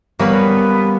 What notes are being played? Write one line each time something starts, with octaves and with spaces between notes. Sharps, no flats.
G3 A#3 B3 C#4 B4